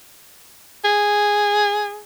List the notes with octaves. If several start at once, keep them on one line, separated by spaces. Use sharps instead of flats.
G#4